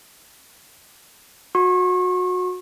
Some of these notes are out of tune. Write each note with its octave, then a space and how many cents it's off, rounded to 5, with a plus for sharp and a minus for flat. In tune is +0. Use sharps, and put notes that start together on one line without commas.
F#4 -25 C#6 -35